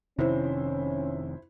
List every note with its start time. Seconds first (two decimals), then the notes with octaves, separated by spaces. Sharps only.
0.19 F1 C3 D#3 C#4 E4 C5